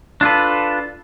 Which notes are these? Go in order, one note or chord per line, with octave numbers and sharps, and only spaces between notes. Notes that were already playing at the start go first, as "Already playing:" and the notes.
D4 F4 A4 B4